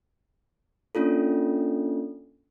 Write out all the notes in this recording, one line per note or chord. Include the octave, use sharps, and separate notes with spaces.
A#3 C#4 D4 F4 A4